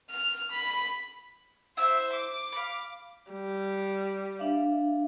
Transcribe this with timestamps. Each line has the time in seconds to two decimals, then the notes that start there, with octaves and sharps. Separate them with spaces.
0.10 F6
0.52 B5
1.77 E4 C5 E5 E6
2.12 D6
2.52 F5 B5
3.31 G3
4.39 D4 E5 F5